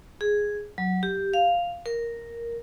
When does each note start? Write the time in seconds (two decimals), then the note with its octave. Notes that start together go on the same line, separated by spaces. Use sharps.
0.21 G#4
0.78 F#3
1.03 G4
1.34 F5
1.86 A#4